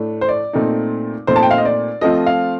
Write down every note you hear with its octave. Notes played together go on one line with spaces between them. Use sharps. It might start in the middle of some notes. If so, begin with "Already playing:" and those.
Already playing: A2 A3 D4
C5
D5
A#2 A3 C4 D#4
A#2 A3 C4 D#4 C5
A5
G5
F5
D#5
D5
F3 A3 C4 F4 D#5
F5